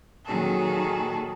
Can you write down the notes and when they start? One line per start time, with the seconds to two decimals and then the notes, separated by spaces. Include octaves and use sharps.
0.24 A#2 D#3 F#3 F#4 G#4 A4